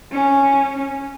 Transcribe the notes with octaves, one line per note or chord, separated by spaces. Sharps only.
C#4